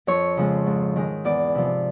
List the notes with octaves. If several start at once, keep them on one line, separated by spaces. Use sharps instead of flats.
F2 C#5
C#3 F3 G#3
G#2
D#3 G#3
E2 D5
C3 F3